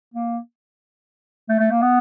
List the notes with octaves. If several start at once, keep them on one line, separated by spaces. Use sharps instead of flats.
A#3
A3
A3
A#3
B3